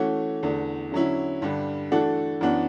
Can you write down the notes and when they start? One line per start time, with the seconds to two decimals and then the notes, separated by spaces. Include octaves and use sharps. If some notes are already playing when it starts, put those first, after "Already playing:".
Already playing: E3 A3 C#4 F#4
0.43 E2 D3 A3
0.92 D3 F#3 C#4 E4
1.42 G2 D3 G3
1.92 E3 A3 D4 F#4 A4
2.41 F#2 E3 B3 D4 F#4